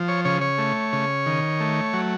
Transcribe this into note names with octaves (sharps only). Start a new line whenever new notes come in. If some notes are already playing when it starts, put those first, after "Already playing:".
Already playing: F3
C#5
C#3 C#5
C#5
A3
C#3
D#3
A3
F#3